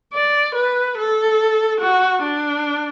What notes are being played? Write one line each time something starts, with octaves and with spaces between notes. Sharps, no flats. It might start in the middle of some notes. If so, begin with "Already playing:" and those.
D5
B4
A4
F#4
D4